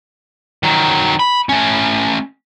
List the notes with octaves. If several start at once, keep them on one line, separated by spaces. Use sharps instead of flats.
D#3 F#3
B5
A3 C#4